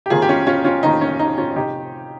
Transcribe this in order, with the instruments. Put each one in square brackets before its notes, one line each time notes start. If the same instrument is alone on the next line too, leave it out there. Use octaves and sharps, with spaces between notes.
[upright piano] G4
F1 F2 D#3 A#3 F4 G#4
G4
C#4 F4
C#4 F4
C#4 F4
F1 F2 D#3 A#3 D#4
C#4
D#4
C#4 F4
C3 F3 D#4 G4